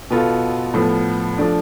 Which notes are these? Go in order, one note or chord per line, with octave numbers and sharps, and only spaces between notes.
B2 B3 F4 A4
A2 F3 B3
F3 A3 D4